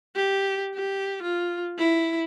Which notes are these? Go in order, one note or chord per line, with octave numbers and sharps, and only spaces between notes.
G4
G4
F4
E4